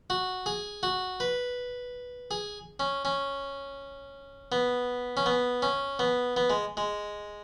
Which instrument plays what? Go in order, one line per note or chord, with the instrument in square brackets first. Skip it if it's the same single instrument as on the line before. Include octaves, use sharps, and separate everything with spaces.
[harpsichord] F#4
G#4
F#4
B4
G#4
C#4
C#4
B3
C#4
B3
C#4
B3
B3
G#3
G#3